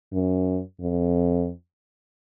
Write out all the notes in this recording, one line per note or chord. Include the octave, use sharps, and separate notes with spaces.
F#2
F2